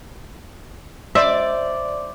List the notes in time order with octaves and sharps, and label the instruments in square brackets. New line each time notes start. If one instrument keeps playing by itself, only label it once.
[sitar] C5 D5 [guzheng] E5